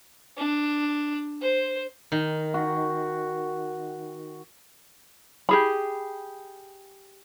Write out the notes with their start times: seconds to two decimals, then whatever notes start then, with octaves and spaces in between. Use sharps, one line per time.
0.37 D4
1.42 C5
2.12 D#3
2.54 F#4
5.49 G4 G#4 B5